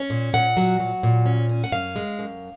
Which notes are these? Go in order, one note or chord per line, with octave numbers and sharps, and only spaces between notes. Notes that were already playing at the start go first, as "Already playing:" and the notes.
Already playing: C#4
A#2
A#2 F#5
F#3
F#3
A#2
C#4
C#4
F#5
F#2 F5
G#3
F#2